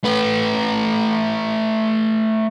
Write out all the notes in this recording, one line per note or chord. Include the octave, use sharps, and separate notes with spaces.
A3 B4